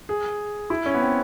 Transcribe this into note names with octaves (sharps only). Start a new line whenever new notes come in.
G#4
E4
C#4
B3
C4